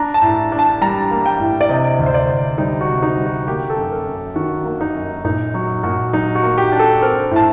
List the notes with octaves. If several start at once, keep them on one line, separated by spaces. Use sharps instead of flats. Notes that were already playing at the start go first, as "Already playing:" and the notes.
Already playing: D4 A#5
A5
A2
D4
A5
G3 A#5
A#3
G5
A2
D5
C3 D#5
D2
C5
D5
D2
G3 D#4
F#4
C3
D#4
G3
F#4
A#3 G4
A4
F#2
A#4
F#2
D#3 F#4
A#3
D#4
F#2
A#2 D#4
F#3 F#4
A#2 F#4
F#3 D#4
F#4
A#3
G4
D4
A4
C4 A#4
A2 A5